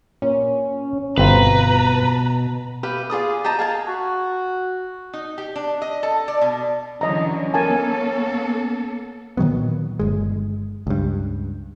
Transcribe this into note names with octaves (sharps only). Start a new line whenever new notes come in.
A#2 C#4
G1 B2 C4 F4 B4 A#5
G4 B4 E5 F5
F4 G#4 D5 D#6
G4 D#5 A5 A#5
G#4 F5 G5 A5
F#4
D#4
G4
D4
D#5
A4
D5
B2
D3 E3 F#3 C#4 D#5 A#5
A#3 B3 A4 A#4 G#5 A5
A#2 D#3 F#3 B3
G1 G#3
C#2 G2